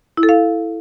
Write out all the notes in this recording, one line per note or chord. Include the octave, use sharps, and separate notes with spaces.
E4
A4
F5